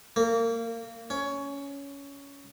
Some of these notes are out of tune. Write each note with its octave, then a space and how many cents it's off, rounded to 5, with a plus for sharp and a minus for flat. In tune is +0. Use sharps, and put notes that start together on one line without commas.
A#3 -25
C#4 +15